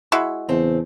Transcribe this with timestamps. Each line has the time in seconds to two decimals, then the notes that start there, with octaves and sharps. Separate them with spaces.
0.12 G#3 E4 F#4
0.49 E2 C#3 C4 A5